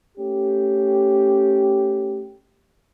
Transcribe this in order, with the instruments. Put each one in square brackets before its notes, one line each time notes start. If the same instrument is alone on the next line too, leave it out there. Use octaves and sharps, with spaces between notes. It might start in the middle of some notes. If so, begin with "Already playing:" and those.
[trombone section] A3 C#4 G4